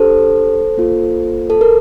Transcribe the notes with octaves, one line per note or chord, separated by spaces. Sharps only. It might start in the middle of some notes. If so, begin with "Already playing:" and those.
Already playing: D4 G4 A4 C5
A#3 F4 A4
A4
A#4